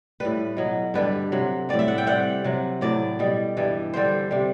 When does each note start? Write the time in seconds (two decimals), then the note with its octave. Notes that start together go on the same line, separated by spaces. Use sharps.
0.20 A2 G3 B4
0.57 B2 F#3
0.94 G2 D3 G3 B4
1.32 C3 F#3
1.69 A2 G3 D5
1.79 E5
1.88 F#5
1.98 G5
2.07 C3 G3 F#5
2.44 C3 F#3
2.81 A2 F#3 D5
3.19 B2 G3
3.57 G2 E3 G3
3.94 G2 D3 G3 C5
4.31 C3 G3